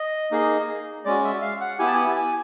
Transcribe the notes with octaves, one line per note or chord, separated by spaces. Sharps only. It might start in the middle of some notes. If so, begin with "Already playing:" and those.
Already playing: D#5
A#3 D#4 G#4
G#3 C#4 F#4 D5
E5
F5
F#5
B3 E4 G4 G#5
A5
G#5
G#5